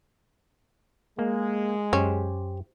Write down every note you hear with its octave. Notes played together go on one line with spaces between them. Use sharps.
G#3 A#3
F#2 C#4 G4 C5